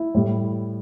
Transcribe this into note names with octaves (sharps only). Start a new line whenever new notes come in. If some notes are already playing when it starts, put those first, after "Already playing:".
Already playing: E4
A2 G3